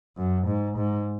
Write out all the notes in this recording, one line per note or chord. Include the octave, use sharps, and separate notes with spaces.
F#2
G#2
G#2